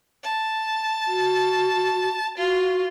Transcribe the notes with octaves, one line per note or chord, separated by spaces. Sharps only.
A5
F#4
F4 F#4